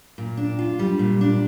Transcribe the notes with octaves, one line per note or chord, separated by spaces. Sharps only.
A#2
D4
F4
G3
A#2
D4